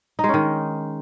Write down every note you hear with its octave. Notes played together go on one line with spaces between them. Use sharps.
D#4
G#3
C#4
D#3